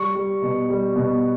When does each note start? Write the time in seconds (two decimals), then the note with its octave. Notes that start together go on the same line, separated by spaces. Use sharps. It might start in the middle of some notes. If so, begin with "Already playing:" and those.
Already playing: G3 C#6
0.15 G3
0.42 B2
0.70 G3
0.96 B2